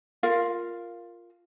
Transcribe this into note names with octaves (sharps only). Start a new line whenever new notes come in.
F4 A#4 F5